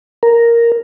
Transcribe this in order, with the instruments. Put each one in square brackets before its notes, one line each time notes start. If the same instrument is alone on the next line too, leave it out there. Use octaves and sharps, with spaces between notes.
[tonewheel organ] A#4